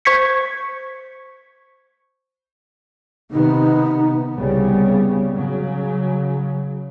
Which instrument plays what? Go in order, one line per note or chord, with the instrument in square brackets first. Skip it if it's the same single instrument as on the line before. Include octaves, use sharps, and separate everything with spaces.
[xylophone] C5 C#6 G#6 B6 C#7
[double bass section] C3 D#3 B3 [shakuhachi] D#4
[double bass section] C2 C#3 G3 B3
C#3 F#3